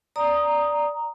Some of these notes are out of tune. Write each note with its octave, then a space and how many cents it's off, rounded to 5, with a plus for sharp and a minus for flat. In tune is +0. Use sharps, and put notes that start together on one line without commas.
D5 +0 A#5 +0 D#6 +0